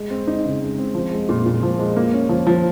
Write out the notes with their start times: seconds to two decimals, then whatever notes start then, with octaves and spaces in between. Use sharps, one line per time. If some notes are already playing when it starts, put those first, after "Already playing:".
Already playing: G#3
0.10 C4
0.27 D#4
0.45 C#3
0.61 G#3
0.78 C4
0.95 F3
1.12 G#3
1.29 A#2
1.46 A#2
1.63 F3
1.79 G#3
1.96 A#3
2.13 C#4
2.29 F3
2.47 F3